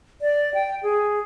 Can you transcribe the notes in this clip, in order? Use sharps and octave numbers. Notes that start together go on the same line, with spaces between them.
D5
G5
G#4